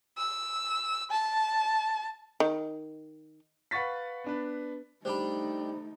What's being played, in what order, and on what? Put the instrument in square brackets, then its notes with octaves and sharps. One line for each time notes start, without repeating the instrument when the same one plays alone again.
[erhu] E6
A5
[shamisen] D#3
[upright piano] B4 F5 F#5 C#6 A6 B6
B3 D4 B4
[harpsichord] G3 D4 G4 [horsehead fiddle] A3 D#4 [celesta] C5 B5